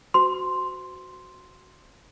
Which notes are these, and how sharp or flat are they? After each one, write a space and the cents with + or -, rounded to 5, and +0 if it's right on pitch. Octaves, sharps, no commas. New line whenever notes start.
F#4 +0 C5 -35 C6 +0